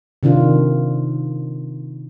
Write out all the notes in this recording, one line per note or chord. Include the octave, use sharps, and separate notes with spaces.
C3 D#3 D4 F4